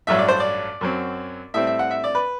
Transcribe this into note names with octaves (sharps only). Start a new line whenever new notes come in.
A1 G2 F#3 E5
D5
C5
D5
F#2 F#3 C4
A2 G3 C4 E5
E5
F#5
E5
D5
B4